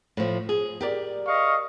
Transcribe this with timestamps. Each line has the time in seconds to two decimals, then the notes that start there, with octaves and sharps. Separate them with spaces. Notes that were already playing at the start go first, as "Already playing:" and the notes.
0.17 A2 F3
0.49 G#4
0.81 G4 A#4 D5
1.27 D#5 F5 C#6